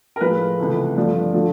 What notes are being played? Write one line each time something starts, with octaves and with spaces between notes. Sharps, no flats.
A#4
A2 F3 G#3 B4
C#2 C3 E3 A3
G2 D3 F3 A3
D3 F3 A3